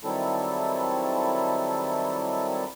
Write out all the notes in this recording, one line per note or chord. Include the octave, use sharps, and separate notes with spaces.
D#3 F#3 G3 C4 E4 A4